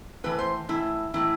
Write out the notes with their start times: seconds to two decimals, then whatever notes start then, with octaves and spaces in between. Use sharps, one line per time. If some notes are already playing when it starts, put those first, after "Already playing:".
0.24 A2 E3 B4
0.39 C5
0.69 A2 E3 E4
1.14 A2 E3 E4